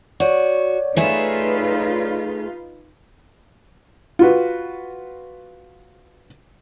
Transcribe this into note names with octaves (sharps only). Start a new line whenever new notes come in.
F#4 C#5 D5
A3 D#4 F4 G#4 B4 E5
F4 F#4 B4